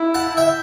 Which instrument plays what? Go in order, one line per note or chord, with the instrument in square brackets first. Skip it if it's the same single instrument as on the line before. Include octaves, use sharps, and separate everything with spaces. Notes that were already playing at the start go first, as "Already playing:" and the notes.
Already playing: [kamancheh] E4
[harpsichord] F#5 A5
E5 G5